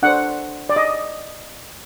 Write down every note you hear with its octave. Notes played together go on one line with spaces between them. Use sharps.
D4 A4 C5 F#5
D5
D#5